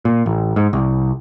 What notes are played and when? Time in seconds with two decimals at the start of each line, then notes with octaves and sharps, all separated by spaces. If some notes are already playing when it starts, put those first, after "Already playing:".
0.05 A#2
0.26 A1
0.56 G#2
0.73 C2